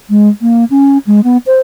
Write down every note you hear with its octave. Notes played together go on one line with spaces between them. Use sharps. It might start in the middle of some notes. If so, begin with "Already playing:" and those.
G#3
A#3
C#4
G#3
B3
C5